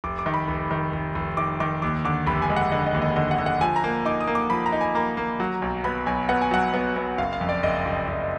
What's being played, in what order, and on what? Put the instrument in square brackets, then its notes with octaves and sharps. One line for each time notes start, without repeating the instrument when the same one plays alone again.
[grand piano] F1 D6
D6
D#3
B5
F1
D#3
F1
F1
D#3 D6
D#3 D6
D#2 D6
D3 D6
F1 B5
G#5
G#3
F#5
D3 D#5
D#5
D#2
D#5
D3 D#5
F#5
D3
F#5
F3 G#5
A#5
A#3
D#4 D6
D#6
A#3
D6
F3 B5
A#5
D#4
G#5
A#3 A#5
A#3
F#3
B1
B3 B5
B1 G#5
B3 F#5
G#5
F#3 F#5
B3
B3
F#1 F5
F5
F2
D5
F#1 D#5
F#1
F#1